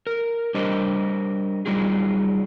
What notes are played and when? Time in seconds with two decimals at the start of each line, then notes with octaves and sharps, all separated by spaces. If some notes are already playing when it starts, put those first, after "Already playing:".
0.07 A#4
0.55 G3 D4 G4 A#4 C5 D#5
1.66 F#3 G3 D#4 F4 G#4